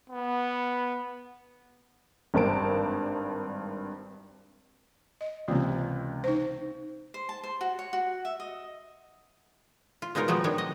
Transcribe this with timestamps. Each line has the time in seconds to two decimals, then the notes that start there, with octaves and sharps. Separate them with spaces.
0.10 B3
2.34 G#1 G2 A#4 C5 A5 D7
5.21 D#5
5.48 C#2 C3 E3 A#3
6.24 D#4 C5
7.14 C5
7.29 A5
7.44 C5
7.61 F#4
7.79 C#5
7.93 F#4
8.25 E5
8.40 D#5
10.02 F4
10.15 B2 G#3 D#4 F4 A#4 C#5
10.28 F3 F#3 G#3 B3 C4
10.44 D#3 F3 D4 C#5 G5
10.58 D#5